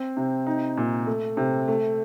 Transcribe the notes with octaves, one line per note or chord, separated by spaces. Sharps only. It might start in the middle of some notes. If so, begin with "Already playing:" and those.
Already playing: C4
C3
D#4
A#2
A3
C3
A3